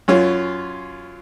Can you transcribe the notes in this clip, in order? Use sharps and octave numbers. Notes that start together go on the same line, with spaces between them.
F#2 C#4 F4